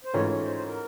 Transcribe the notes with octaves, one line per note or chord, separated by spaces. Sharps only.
C5
G#2 E3 A3 C#4 F4 C#5
C#5
C5
C5
A#4